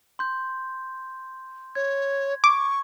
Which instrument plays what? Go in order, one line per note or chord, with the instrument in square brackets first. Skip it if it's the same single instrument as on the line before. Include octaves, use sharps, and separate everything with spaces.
[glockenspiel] C6 G6
[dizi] C#5 [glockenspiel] G#6
[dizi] C#6 [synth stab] D6